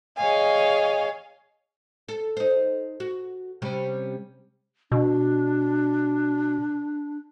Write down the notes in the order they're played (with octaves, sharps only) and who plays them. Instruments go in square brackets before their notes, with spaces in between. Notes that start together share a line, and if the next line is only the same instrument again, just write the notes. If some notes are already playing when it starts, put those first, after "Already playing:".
[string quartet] G#4 C#5 D#5 F5 G#5
[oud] A4
D#4 C5
F#4
C3 G3 C#4
[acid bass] B2 [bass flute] D4